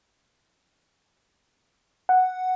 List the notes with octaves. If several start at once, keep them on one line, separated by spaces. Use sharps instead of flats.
F#5